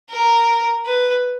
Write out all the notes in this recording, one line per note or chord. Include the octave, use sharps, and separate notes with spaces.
A#4
B4